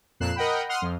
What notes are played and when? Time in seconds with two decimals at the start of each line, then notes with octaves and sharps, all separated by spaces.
0.20 F2 A#2 F#6 C7 E7
0.36 A#4 D#5 F#5 G5 B5
0.69 F#5 C6 D#6 F6
0.82 F2